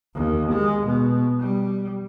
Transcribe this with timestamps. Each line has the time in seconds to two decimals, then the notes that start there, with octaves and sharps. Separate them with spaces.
0.15 D#2
0.52 G#3
0.86 B2
1.40 G3